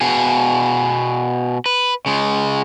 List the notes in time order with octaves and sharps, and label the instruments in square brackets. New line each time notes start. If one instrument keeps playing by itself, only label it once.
[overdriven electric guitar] B2 G#4
B4
C#3 G#3